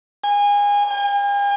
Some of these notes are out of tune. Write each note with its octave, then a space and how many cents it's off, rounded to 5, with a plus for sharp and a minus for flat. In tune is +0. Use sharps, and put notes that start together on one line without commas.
G#5 -25
G#5 -45